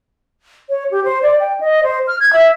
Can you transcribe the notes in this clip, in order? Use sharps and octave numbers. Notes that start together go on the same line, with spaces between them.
C#5
G4
C5
D5
G5
D#5
C5
F6
G#6
E5